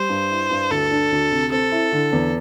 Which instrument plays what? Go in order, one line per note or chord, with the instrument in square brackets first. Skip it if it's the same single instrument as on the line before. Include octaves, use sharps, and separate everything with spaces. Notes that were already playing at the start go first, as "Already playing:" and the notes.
Already playing: [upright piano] G3 [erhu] C5
[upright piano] G2
E4
G2
[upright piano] D2 [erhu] A4
[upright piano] D4
D2
C3
[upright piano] C4 [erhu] A4
[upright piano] E4
D3
E2